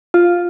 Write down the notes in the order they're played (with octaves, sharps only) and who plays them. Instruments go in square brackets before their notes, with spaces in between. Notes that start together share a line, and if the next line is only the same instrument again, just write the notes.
[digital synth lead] F4